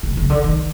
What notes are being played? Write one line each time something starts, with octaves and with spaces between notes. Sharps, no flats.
C3
C#3
D3
D#3